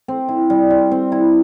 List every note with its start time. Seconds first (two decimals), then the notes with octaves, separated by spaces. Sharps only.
0.08 C4
0.29 E4
0.50 G3
0.71 G3
0.91 C4
1.12 E4